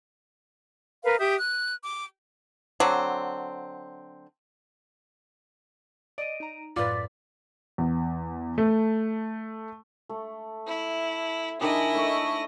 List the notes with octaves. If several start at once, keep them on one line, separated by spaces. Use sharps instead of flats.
A#4 B4 F5
G4 E5 D#6 G6
F#6
D6
D3 F#3 C4
D5 D#5 D7 D#7
D#4 A#5
F#2 A2 F4 B4 D5 D6 A6 B6
E2
A3
A3
E4
D#3 D4 E4 G#4 D#5
A3 C#5 C#6